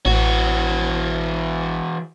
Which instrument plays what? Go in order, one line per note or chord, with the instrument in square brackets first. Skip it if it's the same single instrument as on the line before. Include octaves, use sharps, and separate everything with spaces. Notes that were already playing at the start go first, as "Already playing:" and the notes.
[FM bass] A1 [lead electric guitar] E3 F#4